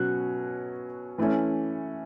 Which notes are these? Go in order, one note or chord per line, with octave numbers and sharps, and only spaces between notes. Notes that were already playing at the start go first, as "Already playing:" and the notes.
Already playing: B2 F#3 C#4 F#6
E3 A3 C#4